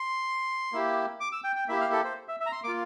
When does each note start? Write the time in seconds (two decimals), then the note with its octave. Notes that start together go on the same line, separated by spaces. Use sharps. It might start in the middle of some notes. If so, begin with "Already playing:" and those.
Already playing: C6
0.73 A#3 E4 G4
1.20 D6
1.32 E6
1.44 G5
1.56 G5
1.68 A#3 E4 G4 E5
1.80 F5
1.92 A4
2.05 C5
2.28 E5
2.40 E5
2.46 A#5
2.52 C6
2.64 A#3 D6
2.68 F4